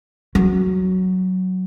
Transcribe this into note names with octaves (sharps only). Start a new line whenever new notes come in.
F#3